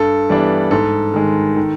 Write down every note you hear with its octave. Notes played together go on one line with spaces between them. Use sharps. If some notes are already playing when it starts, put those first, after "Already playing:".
Already playing: G2 A4
E3 G3 B3 D4
G#2 A4
D#3 G#3
D#3